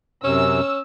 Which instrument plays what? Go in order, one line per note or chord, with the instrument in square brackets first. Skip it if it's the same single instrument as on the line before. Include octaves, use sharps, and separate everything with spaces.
[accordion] F#2 C3 [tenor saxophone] C#4 [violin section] E6